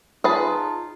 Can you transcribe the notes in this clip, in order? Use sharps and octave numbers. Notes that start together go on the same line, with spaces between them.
D#4 F4 G#4 B4 A5